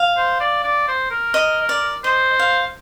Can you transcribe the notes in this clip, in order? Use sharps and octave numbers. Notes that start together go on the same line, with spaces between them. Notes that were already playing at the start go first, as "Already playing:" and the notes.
Already playing: F5
C5
D5
D5
C5
A#4
D#5
D5
C5 D#5
F5